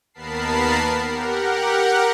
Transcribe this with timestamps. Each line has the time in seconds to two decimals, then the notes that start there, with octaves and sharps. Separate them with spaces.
0.14 D#2 B3 A#4 A5 B5 C7
1.09 G4 A#4 F#5